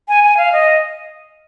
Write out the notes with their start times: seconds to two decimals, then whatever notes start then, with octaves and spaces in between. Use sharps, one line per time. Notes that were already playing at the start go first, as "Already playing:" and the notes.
0.08 G#5
0.24 G#5
0.37 F5
0.53 D#5